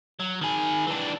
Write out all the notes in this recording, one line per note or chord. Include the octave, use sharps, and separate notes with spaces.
F#3
D#3 G#4
E3 D4